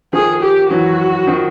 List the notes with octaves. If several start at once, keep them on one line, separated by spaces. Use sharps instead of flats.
D#3 F3 G#4
G4
E3 F#3 F#4
D#3 F3